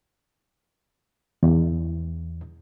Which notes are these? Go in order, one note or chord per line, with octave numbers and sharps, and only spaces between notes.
E2